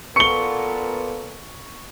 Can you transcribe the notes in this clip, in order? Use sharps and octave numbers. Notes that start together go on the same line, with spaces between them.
A#2 B3 A4 C#6 C#7 G7